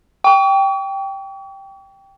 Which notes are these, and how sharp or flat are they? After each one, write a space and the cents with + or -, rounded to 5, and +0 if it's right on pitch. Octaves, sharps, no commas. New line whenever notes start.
G5 +0 C#6 +45